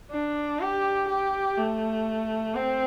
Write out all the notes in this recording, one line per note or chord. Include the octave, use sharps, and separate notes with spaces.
D4
G4
G4
A3
C4